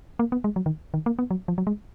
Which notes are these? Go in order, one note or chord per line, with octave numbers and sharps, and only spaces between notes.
A#3
B3
G#3
F#3
D#3
D#3
A#3
B3
F#3
F3
F#3
G#3